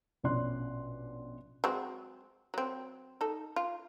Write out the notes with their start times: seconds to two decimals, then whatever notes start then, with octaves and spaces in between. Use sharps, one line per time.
0.23 A#1 B2 C#4 D5 C6 F#6
1.64 F#3 G#3 C4
2.54 F#3 C4
3.21 D#4 A4
3.56 F4